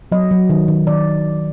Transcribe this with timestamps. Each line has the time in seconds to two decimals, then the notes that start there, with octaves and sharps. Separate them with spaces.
0.12 F#3 D#5
0.31 F#3
0.50 D#3
0.68 D#3
0.87 D#3 D5